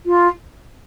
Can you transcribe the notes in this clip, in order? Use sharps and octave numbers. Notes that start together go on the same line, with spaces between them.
F4